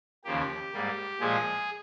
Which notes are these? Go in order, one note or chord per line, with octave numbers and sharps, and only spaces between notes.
D#2 C#3 F3 A#3 G4
G#2 G3 A#3
A#2 F3 G#3 G#4